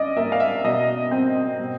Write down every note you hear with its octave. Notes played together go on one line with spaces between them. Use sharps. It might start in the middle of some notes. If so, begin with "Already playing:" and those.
Already playing: C#4 D5 D#5
A#3 E5
F5
E5
B2 D#5
C4
B2